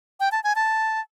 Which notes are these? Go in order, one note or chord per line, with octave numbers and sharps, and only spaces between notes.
G5
A5
G#5
A5